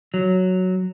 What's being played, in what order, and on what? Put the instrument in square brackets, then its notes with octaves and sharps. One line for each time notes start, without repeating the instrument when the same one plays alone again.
[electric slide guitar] F#3